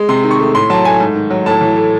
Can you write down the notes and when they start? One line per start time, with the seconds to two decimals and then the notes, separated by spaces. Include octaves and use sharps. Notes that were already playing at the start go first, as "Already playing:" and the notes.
Already playing: G#3
0.09 C3 C6
0.23 D#3
0.31 C#6
0.39 A3
0.55 A2 C6
0.70 F#3 A5
0.85 A3 G#5
1.00 G#2
1.15 D#3
1.30 F#3
1.46 A2 A5
1.61 E3
1.77 A3